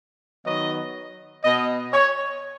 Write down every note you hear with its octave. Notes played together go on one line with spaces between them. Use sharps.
D#3 F#3 B3 D#5
B2 B3 D#5
C#5